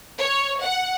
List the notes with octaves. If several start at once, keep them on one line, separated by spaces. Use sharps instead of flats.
C#5
F#5